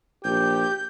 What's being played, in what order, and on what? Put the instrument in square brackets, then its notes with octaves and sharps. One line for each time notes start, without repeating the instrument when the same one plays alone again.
[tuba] A#1 [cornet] G4 [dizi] G6